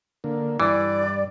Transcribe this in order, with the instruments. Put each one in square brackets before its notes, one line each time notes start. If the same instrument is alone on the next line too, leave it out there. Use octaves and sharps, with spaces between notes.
[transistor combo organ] D3 A#3
[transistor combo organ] G2 [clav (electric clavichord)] E3 [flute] D5